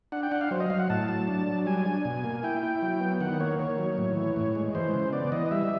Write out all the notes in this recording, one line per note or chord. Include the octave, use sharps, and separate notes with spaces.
D4 F#5
G5
D4 F#5
F5
F#3 C5
D#5
F#3 F5
F#5
A2 A5
F#3
D4
F#3
G3 G#5
D4
B2
A#3
E4 G5
E4
F#3
B3
D#3 F#5
A#3 C#5
D#3 C#5
F#3
A2
E3
A2
G#3
E3 C5
C#3
B3 D5
E3 D#5
G3 E5